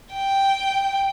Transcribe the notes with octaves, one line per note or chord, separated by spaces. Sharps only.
G5